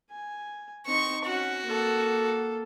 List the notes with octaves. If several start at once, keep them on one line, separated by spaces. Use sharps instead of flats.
G#5
C4 D#4 C#6
C#4 F#4
A#3 A4